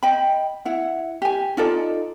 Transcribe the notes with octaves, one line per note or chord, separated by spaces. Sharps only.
D#5 G5 B5
E4 F#5
G4 G#5
D#4 F4 A4 D5